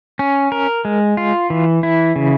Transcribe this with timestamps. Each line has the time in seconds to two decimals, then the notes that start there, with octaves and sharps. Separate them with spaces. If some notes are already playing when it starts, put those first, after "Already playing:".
0.19 C#4
0.52 A#4
0.85 G#3
1.17 F4
1.50 E3
1.83 E4
2.16 C#3